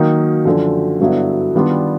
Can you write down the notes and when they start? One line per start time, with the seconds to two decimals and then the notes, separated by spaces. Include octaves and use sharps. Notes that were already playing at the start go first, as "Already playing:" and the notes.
Already playing: D#3 F#3 A#3 D#4
0.45 F#2 D3 F3
1.00 G2 D3 F#3 B3 E4
1.55 D#3 G3 B3 D4 F4